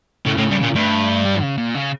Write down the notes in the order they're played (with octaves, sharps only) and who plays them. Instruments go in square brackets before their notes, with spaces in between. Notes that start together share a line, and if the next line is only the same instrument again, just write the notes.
[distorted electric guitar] A2 [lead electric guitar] C#3
[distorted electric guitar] A2
G2
A#2
[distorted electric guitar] G2 [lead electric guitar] A3
[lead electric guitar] G3
C#3
A#2
C#3